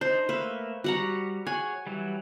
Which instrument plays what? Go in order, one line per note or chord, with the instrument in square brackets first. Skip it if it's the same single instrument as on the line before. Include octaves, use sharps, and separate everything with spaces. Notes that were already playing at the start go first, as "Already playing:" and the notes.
[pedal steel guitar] D4 D#4 [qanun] C5
[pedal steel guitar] A3 A#3 E5 [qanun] B4
[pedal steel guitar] G3 [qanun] F#4 F#5 A#5
[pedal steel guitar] G#4 C#5 F#5 [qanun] G#5
[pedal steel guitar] E3 F#3 G3